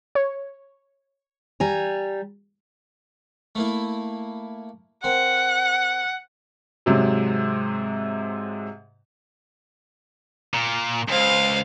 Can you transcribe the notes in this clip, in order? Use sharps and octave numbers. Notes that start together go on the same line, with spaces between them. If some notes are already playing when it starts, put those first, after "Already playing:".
C#5
G3 G#5 A#5
A3 A#3 E4
C4 A#4 F#5
G#2 C3 F#3
A#2
C#2 C5 F5